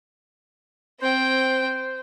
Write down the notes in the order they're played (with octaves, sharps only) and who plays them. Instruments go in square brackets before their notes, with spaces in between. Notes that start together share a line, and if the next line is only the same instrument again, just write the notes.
[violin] C4 G5 [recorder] C5